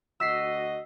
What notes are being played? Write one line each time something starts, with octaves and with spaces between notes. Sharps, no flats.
D2 F#4 D#5 E6 B6 C7